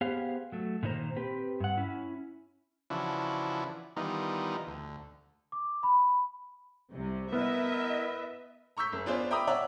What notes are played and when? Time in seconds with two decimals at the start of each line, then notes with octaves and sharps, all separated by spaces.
0.01 B3 G4 G#4 C5 F5
0.52 F#3 A3
0.83 A#2 D#3 D#4 C5 A#5
1.17 C4 G4 B4
1.60 G2 F#5
1.78 C#4 E4
2.90 C#3 E3 F3 D4 E4 F#4
3.96 D#3 E3 G3 B3 D#4 F4
4.67 D2
5.52 D6
5.83 B5
6.93 C2 C3
7.33 B3 E4 A#4 B4 D#5 E5
8.77 A#5 C#6 E6 G6 B6
8.92 F#1
9.06 B3 C#4 D4 F4 G#4 C5
9.31 E5 G5 A#5 B5 D6 D#6
9.47 C#5 D5 E5 F#5 A#5